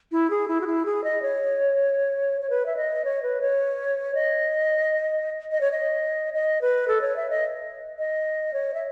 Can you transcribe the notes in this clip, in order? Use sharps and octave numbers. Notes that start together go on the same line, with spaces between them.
E4
G#4
E4
F#4
E4
G#4
D#5
C#5
C#5
B4
E5
D#5
C#5
B4
C#5
D#5
D#5
C#5
D#5
D#5
B4
A4
C#5
E5
D#5
D#5
C#5
E5